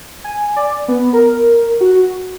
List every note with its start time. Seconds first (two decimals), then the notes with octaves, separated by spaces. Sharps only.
0.24 G#5
0.56 D5
0.88 B3
1.13 A#4
1.81 F#4